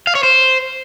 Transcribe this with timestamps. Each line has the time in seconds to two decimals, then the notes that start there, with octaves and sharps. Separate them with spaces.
0.07 F5
0.15 C#5
0.23 C5